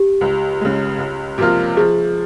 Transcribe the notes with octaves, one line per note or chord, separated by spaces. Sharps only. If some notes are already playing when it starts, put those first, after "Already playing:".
Already playing: G4
C#2
C#3 G#3
C#2
C3 F3 A#3 F4
F3 G#4